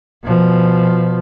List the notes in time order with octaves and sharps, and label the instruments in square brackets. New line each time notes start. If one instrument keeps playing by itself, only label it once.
[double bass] B2 F3